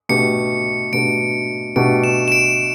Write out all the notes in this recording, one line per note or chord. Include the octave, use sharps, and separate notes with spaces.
B2 A3 D4 G4 B4 C#7
B2 A3 D4 G4 B4 D7
B2 A3 D4 G4 B4 D7
E7
E7
D7